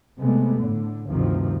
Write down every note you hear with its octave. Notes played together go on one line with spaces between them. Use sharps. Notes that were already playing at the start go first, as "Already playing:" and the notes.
C3 G#3 A3 B3
A2 D3
D2 G2 C3 D#3 F3